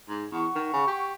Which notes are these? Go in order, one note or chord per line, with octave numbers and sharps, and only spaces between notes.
G#2
E2 F#5 C#6
D#3
C#3
G4